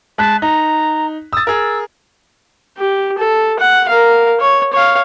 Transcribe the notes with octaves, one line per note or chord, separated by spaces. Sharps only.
G#3 A5 F#6 B6
D#4 A#5
D#6 E6 A6
G#4 A#4 E6
G4
A4
F#5
A#4 F5
C#5
C#5 F5